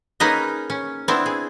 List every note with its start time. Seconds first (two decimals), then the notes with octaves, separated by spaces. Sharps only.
0.20 A#3 C#4 D#4 G#4 B4 D#5
0.70 C#4
1.08 B3 C4 D4 E4
1.26 G#4